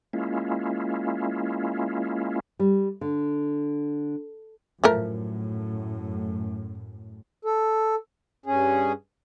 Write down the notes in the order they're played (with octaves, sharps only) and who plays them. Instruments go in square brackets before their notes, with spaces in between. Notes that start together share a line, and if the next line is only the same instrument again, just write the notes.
[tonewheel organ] G#3 A#3 C#4 E4 F4
[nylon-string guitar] G3
D3
[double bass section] F#2 A2 [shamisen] F3 A3 A#4
[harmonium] A4
G2 C#4 G#4